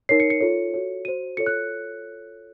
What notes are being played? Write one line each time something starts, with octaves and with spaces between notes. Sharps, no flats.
D#4 A#4 C#5 C7
C#7
C#7
F4 A4 C#5
F#4 A4 C#5
F#4 C5 D#7
F4 A4 C#5 C#7
F#6